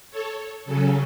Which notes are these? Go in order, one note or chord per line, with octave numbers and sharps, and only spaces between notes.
A4 C#5
C#3 F#3 C#4 A4